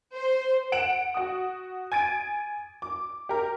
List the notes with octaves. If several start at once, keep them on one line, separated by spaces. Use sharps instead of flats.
C5
F#5 D7 E7 F#7
F#4 D#6
G#5 G#6 A6 D7 D#7
D6
G4 A#4